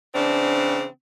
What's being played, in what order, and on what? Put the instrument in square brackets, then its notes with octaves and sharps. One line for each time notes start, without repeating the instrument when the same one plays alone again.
[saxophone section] C#3 E3 C4 D4